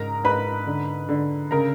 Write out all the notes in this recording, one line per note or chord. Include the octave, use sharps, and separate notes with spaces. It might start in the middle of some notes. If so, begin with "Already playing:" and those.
Already playing: G#2 C#3 A#4 A#5
G#2 B4 B5
D3
D3
C#3 A#4 A#5